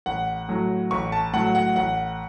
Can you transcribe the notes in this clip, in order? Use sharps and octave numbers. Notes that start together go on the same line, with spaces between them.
A1 F#5
A2 F#3
A1 C#6
A5
A2 F#3 F#5
F#5
A1 F#5